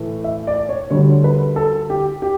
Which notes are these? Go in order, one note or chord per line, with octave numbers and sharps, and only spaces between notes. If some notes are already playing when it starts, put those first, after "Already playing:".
Already playing: A2 E3 A3
E5
D5
C#5
D2 D3 G3 C#5
B4
A4
G4
G4